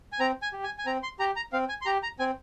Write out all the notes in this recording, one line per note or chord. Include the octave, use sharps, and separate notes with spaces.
G#5
C4 A#5
G#5
G4
G#5
G#5
C4 A#5
C6
G4 A#5
A#5
C4 F5
G#5
C6
G4 A#5
A#5
C4 G#5